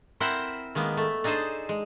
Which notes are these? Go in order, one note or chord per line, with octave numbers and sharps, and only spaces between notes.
C4 E4 A#4 C5 E5 F#5
D#3 G#3 A#3 B3
A3
D4 D#4 G#4 A4 C5
G#3